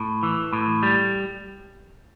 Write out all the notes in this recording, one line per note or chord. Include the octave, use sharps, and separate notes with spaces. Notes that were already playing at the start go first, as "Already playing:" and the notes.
Already playing: A2
E3
A2
G3